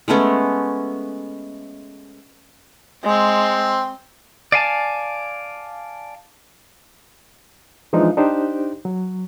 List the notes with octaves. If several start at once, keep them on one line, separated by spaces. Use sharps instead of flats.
G#3 A3 B3 C#4
G#3 C4
D5 F5 G#5 A5
E3 F3 G#3 D4 D#4
D4 D#4 G4 C5
F#3